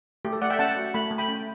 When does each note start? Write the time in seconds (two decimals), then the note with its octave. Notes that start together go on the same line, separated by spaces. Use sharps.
0.25 A3 G4
0.33 A4
0.42 A3 D5 F#5
0.50 E5 G5
0.59 C#4 F#5 A5
0.76 F#4
0.94 A3 B5
1.11 A3
1.18 G5 B5
1.28 C#4